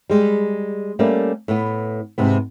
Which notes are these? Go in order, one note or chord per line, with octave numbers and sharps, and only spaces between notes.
G3 G#3
G3 A3 A#3 C#4 D5
A2 B3
G#2 C3 B3